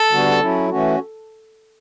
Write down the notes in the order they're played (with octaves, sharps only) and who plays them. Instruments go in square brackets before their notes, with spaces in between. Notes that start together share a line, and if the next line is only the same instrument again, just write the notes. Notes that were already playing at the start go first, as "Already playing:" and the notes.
Already playing: [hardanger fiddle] A4
[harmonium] D3 G3 B3 F#4
F#3 C#4 E4
E3 A3 C#4 F#4